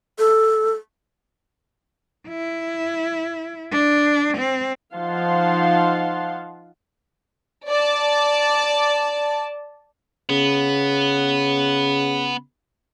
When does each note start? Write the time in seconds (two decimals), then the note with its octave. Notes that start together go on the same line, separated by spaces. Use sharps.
0.19 A4
2.28 E4
3.71 D4
4.38 C4
4.94 F3 D#4 F5 F#5 A5 C6
7.69 D5 A5
10.30 C#3 B3